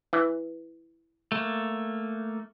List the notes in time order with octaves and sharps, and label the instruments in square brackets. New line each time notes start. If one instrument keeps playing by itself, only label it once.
[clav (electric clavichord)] E3
[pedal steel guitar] A3 A#3